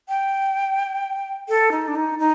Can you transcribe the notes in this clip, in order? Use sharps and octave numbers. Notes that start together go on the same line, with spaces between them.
G5
A4
D#4
D4
D#4
D#4